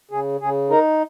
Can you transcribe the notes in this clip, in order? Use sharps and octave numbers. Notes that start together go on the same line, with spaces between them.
C#3 G#4
C#3 G#4
D#4 A#4